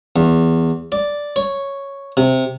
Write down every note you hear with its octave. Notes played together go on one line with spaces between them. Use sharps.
E2
D5
C#5
C3